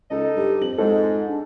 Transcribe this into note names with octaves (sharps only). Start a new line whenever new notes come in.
C#2 D#4 A4 D#5
G2 G4
F2 F#7
G#2 G#3 A4
D4